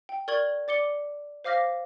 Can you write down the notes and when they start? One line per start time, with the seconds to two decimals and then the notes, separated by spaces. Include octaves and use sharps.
0.09 G5
0.28 A#4 D5 C#6 G#6 F#7 G7
0.68 D5 D6 C#7 G7
1.44 C5 F5 D6 F6 A#6 B6